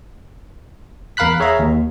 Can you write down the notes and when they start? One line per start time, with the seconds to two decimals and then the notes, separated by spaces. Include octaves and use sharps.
1.17 E2 A#4 F5 B5 F#6 B6
1.40 G#4 C#5 E5 F5 A#5
1.59 D#2